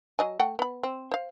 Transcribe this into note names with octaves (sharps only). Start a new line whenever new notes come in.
F#3 D#5 G#5
A3 F#5 G5
B3 B5
C4
C5 F5